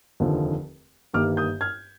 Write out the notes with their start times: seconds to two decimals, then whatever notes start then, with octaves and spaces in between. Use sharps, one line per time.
0.20 F1 D#2 D3 F3
1.13 G1 G2 D#3 G3 A#3 D6 F6
1.37 D#6 G6
1.61 F6 G#6